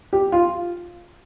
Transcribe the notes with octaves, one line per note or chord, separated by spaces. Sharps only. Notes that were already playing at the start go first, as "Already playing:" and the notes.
G4
F4